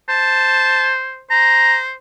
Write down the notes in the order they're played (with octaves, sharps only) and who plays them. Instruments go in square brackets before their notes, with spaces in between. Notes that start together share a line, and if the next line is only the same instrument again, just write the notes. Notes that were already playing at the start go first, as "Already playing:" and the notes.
[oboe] C5 [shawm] A5
[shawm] C5 [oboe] A#5